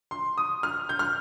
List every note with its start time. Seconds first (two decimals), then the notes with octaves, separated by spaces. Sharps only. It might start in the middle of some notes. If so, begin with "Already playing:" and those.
0.11 C6
0.38 D#6
0.63 F6
0.89 G6
0.99 F6